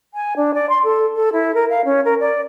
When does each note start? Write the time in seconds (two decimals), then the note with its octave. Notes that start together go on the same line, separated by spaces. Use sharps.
0.14 G#5
0.36 D4
0.54 D5
0.69 C6
0.84 A4
1.15 A4
1.32 E4
1.54 A#4
1.70 F5
1.84 C#4
2.04 A#4
2.20 D5